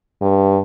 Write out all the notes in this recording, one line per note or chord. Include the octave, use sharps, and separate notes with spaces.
G2